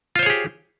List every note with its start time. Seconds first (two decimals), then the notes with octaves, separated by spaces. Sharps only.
0.16 F4
0.19 C5
0.23 C#5
0.26 G#4
0.30 G4